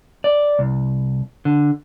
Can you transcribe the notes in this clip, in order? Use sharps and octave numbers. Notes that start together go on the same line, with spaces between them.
D5
C2
D3